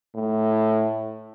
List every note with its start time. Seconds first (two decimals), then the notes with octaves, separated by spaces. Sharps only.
0.15 A2